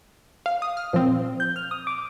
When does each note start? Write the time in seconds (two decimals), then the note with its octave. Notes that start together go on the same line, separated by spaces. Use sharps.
0.46 F5
0.62 D#6
0.77 F6
0.93 A#2 F3 C4
1.40 G6
1.56 F6
1.71 D#6
1.87 D6